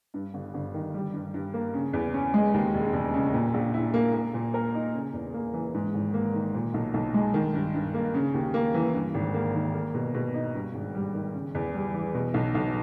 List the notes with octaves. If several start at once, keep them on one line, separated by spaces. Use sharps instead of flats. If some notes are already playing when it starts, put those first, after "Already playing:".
G2
G1
G1
D#3
G3
G2
G2
A#3
C#3
E2
C#4
G#3
D#2
E1
E1
C#3
A#2
A#1
E4
A#3
A#3
A#2
A#4
D#4
C#3
E2
A#3
E3
G#2
G#1
A#3
D#3
A#2
B1
B1
G#3
D#3
G2
G2
A#3
C#3
D#2
A#3
E3
G2
G#1
A#3
D#3
A#3
B2
B2
D#4
G2
G#1
G3
D#3
C#3
E2
G3
E3
B2
B1
B1